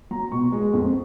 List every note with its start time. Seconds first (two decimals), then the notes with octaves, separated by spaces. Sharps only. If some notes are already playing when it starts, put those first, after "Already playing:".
0.11 F#3 A#5
0.32 B2 C#6
0.52 G#3
0.73 F2